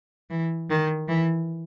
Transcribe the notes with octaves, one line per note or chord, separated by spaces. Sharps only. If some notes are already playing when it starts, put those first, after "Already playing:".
E3
D#3
E3